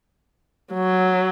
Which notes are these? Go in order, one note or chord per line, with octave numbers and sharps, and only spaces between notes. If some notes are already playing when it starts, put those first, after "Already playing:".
F#3